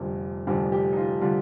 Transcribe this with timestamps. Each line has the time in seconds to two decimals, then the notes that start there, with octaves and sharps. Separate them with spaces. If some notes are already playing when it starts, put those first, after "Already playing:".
Already playing: F1 F2 D3 G3 A#4
0.47 F1 F2 D3 G3
0.72 G4
0.93 D#4
0.97 F4
1.22 D3 G3 F4